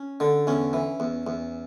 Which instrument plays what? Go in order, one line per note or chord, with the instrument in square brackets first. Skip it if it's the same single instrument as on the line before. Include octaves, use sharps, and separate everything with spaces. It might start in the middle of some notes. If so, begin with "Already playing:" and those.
Already playing: [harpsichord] C#4
D3
E2 C#4
E3
E2
E2